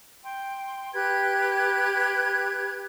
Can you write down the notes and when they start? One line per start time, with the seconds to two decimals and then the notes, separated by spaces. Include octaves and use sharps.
0.24 G5 C6
0.94 G4 B4 F#6 G#6